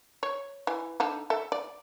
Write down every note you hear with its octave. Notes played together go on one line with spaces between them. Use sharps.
C#5
E3
D3 D#4 A4
A4 E5
D5